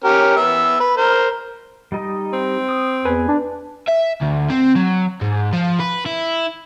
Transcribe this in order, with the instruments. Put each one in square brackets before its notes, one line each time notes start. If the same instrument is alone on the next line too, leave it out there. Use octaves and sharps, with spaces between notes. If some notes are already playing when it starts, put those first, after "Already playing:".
[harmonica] C#4 G4 A#4
B3 E5
B4
A#4 C5
[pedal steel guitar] G3 D#4 D#5
[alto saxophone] C4
[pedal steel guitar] D#6
[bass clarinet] E2 [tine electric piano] B4 [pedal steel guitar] G#5
[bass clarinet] D4
[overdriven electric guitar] E5
D2
C4
F#3
G#2
F3
B4
E4